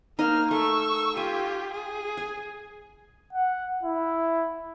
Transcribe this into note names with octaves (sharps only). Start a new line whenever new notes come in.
A#3 D#4 D#5 F6
A3 C#6 E6
F4 G4 G#5
G#4
G#5
F#5
E4